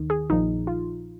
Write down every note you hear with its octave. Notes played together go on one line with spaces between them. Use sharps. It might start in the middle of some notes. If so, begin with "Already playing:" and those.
Already playing: D#2 D#3
G#4
A#1 A#2 F3 D#4
F4